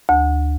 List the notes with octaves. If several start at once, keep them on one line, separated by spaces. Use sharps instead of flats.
D2